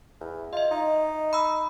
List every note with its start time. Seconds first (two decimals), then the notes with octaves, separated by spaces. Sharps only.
0.21 E2
0.53 F4 D#5 E5
0.71 D#4
1.33 B5 E6